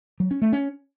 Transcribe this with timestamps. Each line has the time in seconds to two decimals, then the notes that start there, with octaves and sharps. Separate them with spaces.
0.20 F#3
0.31 C#4
0.42 A3
0.53 C#4